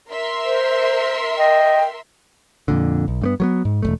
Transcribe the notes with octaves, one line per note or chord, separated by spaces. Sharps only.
A#4 E5 C6
C5
D#5 G5
F2 A#2 D3
B1
G2 A3 B3
F#3 A3 B3
G#2
E1 F2 A3